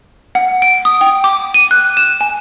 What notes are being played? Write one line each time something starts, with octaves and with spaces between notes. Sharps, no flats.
F#5
D7
D#6
G5
D6
D#7
F#6
E7
G#5